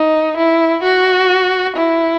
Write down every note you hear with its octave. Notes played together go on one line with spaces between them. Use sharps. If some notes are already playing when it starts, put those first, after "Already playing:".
Already playing: D#4
E4
F#4
E4